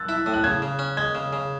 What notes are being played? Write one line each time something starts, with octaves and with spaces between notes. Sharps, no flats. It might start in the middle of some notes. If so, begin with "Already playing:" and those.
Already playing: E6 F#6 A6
E4
A2
F#6
C#3 G#6
C#3
C#4
G#3 G#6
C#3
C#3